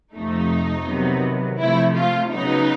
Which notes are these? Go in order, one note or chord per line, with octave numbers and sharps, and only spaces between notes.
F2 C3 F3 A3 D#4
C3 D#3 F#3 B3
C3 F3 A3 E4
F4
C#3 F#3 B3 D#4